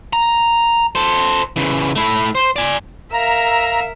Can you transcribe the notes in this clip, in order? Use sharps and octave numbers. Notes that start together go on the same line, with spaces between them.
A#5
A4 C5
C#3 E3
A3 E4
C5
D5 G#5
A#4 E5 F5 A#5 E6